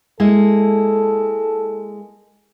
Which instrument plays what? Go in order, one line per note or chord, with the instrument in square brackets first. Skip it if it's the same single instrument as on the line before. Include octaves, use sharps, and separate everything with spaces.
[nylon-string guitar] G#3 A#3 E4 [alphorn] A4